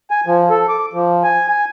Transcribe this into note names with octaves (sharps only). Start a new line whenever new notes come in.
G#5
F3
A4
D6
F3
G#5
G#5